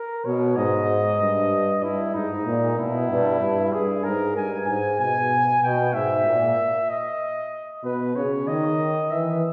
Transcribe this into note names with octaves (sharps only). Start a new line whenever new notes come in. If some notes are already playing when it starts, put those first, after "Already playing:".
Already playing: A#4
B2 C#5
G#2 D#5
G2
G2 E4
G#2 D#4
A#2
B2 E4
G2
G2
G2 G#4
G#2 A#4
G2 G#5
G#2 G#5
B2 G#5
B2 G5
G#2 E5
A#2
D#5
B2 B4
C#3 C#5
D#3 D#5
E3 E5